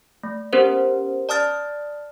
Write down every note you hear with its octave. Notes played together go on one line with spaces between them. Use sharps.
A3
B3 C#4 G4 A#4 C5
D5 A5 D#6 F6 A6